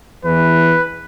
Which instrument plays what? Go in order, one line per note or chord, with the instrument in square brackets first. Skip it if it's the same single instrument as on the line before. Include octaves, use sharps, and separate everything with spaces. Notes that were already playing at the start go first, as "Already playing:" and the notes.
[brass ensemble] E2 E3 [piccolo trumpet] B4